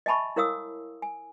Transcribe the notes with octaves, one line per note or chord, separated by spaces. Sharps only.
D#5 E5 G#5 A5 B5 C#6
E4 A#4 C#5 F5 D#6 E6
G#5